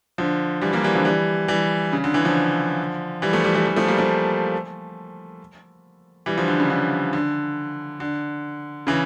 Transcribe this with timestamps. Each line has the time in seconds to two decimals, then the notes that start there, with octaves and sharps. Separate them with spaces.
0.18 D3 F3
0.62 E3 G3
0.73 G3 A#3
0.83 E3 G3
0.95 D3 F3
1.05 E3 G3
1.48 E3 G3
1.93 C#3
2.04 D3
2.14 C#3 E3
2.25 D3 F3
3.22 E3 G3
3.33 F3 A3
3.44 E3 G3
3.55 E3 G3
3.66 E3 G3
3.76 F3 A3
3.88 G3 A#3
3.98 F3 A3
6.26 E3 G3
6.37 D3 F3
6.48 D3
6.60 C#3
6.70 D3
7.13 D3
8.00 D3
8.87 C#3 E3